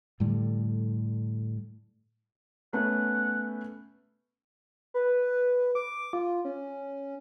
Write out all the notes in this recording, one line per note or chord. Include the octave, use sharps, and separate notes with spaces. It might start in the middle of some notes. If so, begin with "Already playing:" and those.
A2 D3 G3 A3
A3 B3 C#4 F#5
B4
D6
F4
C#4